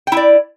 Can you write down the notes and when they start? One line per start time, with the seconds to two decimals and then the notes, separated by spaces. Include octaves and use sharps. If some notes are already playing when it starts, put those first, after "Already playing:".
0.07 G5
0.12 E4
0.17 D5